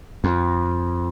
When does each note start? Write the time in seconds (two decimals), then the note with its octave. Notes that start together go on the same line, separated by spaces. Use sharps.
0.24 F2